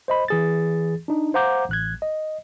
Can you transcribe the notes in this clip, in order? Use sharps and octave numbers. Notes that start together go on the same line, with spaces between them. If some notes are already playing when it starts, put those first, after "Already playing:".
C5 D#5 B5
E3 G#4 A6
D4 D#4
C5 F5 F#5 A#5 D6 G6
A1 F#6 G#6
D#5